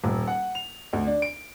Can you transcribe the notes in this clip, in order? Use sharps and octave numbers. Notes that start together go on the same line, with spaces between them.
D#1
F#5
F7
D2
D4
D7